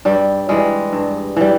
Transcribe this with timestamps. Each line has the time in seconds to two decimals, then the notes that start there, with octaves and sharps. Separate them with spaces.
0.05 G2 G3
0.49 E3 G3 G#3
0.93 G2
1.36 E3 G3